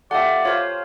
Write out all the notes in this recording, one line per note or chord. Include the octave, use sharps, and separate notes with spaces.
A3 F4 G4 D5 E5 F#5
F4 C5 C#5 F5